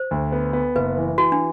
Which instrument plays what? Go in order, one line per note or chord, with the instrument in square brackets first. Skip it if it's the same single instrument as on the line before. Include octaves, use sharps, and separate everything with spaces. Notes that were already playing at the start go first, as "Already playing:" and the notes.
Already playing: [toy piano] C5
[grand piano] D2
B3
B3
[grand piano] F#1 [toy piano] B4
[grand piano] E3
[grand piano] E3 [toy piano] F#4
[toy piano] D4